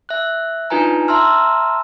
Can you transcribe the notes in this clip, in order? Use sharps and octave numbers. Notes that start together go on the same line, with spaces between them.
E5 F#6
D4 D#4 F4 B4 G#5 A#5
E5 A5 A#5 C6 E6 F6